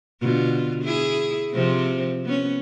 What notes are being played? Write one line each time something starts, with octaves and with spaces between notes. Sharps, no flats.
B2 D3 F4
E4 G#4
C3 F3 C4
B3 C#4